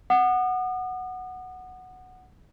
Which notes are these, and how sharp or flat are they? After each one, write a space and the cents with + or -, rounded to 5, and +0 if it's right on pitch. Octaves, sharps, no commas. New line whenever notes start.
F#5 +0 D#6 -40